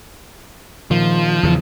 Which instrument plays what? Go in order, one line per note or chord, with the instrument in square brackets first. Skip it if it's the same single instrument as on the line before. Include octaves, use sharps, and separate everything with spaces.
[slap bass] A#2 D#3 [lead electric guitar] F3
[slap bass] E2 C#3 E3